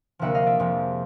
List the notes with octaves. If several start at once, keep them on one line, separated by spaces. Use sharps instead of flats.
D2 C3 F3 A#3 E5 F#5
D#5 F5
D5 E5
F2 C3 F3 G#3